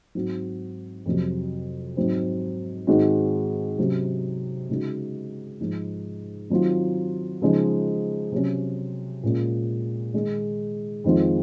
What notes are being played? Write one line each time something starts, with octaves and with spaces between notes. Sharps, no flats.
G#2 F#3 C4 F#4
F2 C3 F#3
G#2 F#3 C4
G#2 D#3 G#3 C4 F#4
C3 F#3 C#4
C#3 G#3 D#4 F#4
G#2 F3 G#3 D#4
D#3 F#3 C4 F4
C#3 F3 G#3 D#4
C3 F#3 C#4
A#2 G#3 C#4 F4
D#3 G#3 D#4 G#4
F2 D#3 G#3 C4 F4